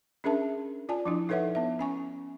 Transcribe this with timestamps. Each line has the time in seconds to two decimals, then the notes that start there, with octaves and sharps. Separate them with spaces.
0.24 C#4 D4 G#4 A#4 E5 A5
0.89 F4 D5 G#5 A5
1.05 F3 D4 E4
1.29 D#4 A4 B4 C#5 E5 F#5
1.55 B3 E5
1.79 C#4 G#5 C#6